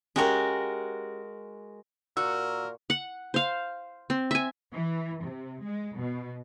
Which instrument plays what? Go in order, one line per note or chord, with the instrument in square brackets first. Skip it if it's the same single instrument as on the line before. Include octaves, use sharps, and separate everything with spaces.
[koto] G#3 F#4 A#4 [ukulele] C#4 G4 F5
[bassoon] A#2 [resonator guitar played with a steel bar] F#4 [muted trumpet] A#4 [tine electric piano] E6
[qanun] F#5
C5 F5
C4
E5 G#5
[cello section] E3
C3
G#3
B2